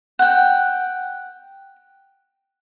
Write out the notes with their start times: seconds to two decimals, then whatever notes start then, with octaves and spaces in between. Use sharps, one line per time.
0.19 F#5 G5